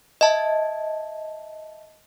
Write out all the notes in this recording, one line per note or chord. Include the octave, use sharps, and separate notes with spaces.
D#5 E5 A5